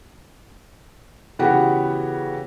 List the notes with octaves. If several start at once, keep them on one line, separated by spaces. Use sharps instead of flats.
C#3 E3 B3 F#4 G4 F#5